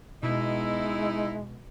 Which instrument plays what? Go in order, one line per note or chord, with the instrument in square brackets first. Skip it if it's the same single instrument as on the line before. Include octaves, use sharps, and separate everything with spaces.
[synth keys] B2 [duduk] G#3 [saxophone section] D#4 E4